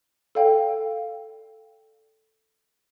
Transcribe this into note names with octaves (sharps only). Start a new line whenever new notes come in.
A4 D5 F5 G5